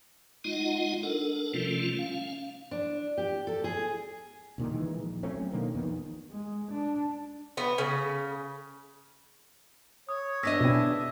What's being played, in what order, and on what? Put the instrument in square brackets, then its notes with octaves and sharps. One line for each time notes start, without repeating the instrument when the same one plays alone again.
[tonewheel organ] G#3 D#4 F4 D#5 F#5
D4 A4 A#4
C3 F3 G3 A3 C#4 F4
C#4 F5
[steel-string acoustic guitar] D4
G4
A4
G#4
[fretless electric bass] C2 A#2 D#3
D#3 E3 G#3
A#1
F#3 A3 C4 C#4
B2 D3 D#3 A#3
A#1 E2 D#3 E3
[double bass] G#3
D4
[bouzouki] B3
C#3
[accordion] C#5 [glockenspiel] D#6
[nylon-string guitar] B3 D4 D#5 [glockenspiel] E6 A#6 B6
[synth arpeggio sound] B2 C4 [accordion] A3 E4 G#4
[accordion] E5